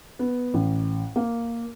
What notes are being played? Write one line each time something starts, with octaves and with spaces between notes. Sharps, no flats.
B3
A1
A#3